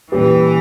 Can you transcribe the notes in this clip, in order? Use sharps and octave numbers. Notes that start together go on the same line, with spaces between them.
A#2 E3 G3 C#4 G4 B4